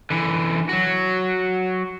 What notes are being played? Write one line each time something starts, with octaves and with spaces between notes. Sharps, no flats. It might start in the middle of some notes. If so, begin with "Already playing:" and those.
D3 E3
F#3 F#4